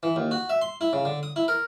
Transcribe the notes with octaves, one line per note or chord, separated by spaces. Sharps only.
E3
D#2
F#4
E5
C6
E4
C#3
D3
D#6
E4
A#4